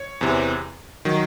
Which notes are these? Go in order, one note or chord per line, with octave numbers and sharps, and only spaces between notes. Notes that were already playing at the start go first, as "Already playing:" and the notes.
Already playing: C#5
E2 C3 E3
D#3 F#3